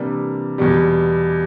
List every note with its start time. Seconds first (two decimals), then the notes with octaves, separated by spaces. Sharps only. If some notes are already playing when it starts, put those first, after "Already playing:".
Already playing: C3 E3 G3 A#3 D4
0.58 E2 B2 G3